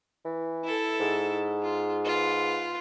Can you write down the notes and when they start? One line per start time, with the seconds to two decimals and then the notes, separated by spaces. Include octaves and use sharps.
0.25 E3
0.64 E4 A4
0.99 G#2
1.62 F4
2.05 F4 B4